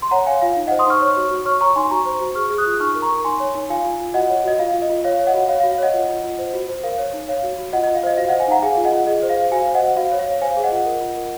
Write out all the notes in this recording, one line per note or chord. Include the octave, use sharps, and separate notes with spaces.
C6
C#5 F#5 A#5
C#5 F5 G#5
F4 F5
D#4
D#5 F#5
C5
C6 D#6
D#4 C#6 F6
C#5 C#6 F6
F#4
F#4
C#5 C#6 F6
C#5 A#5 C#6
D#4 G#5 C6
F#4 A#5 C#6
C5
F#4
G#4 C#6 F6
G#4
D#6 F#6
F4
D#4 C#6 F6
A#4
A#5 C#6
A#4
D#4 G#5 C6
C#5
D#4
F4 F5 G#5
F4
F4
F#4 D#5 F#5
C#5
F#4 D#5
F4 F5
F4
D#5
F4
C#5 F5
C#5
D#5 F#5
F#4
C#5 F5
F5
F#4
F5
C#5 D#5 F#5
F4
F4
F4
C5
F#4
C5
A#4 F5
C#5
D#4
C#5 F5
F#4
F#4
F4 D#5 F#5
D#5
F4
F5
C5 D#5
F#4 F5
D#5 F#5
C5
F5 G#5
D#4 F#5 A#5
G#4 F5 G#5
F4
D#5 F#5
F4
G#4 D#5
C5
F5
C5
F#4 F5 G#5
C5
D#5 F#5
F#4
F#4 F5
F5
C#5
F5
C#5
C5 F5 G#5
G#4
D#5 F#5
F4
A#4
F4
A#4